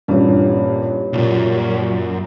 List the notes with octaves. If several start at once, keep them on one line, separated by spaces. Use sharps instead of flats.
A1 G2 A#2 G4 C#5
B1 F#2 A#2